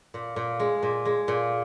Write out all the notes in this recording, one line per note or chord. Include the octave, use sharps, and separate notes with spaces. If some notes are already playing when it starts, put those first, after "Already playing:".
A#2
A#2
G#3
A#2
G#3
A#2